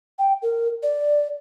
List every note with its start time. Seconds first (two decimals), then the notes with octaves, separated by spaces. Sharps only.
0.19 G5
0.42 A#4
0.83 D5